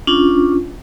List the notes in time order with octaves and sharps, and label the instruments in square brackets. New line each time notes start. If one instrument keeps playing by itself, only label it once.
[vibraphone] C#4 D4 F4